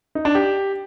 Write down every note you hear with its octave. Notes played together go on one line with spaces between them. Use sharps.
D#4
D4
G4